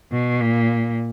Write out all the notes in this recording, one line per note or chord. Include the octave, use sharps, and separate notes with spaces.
B2
A#2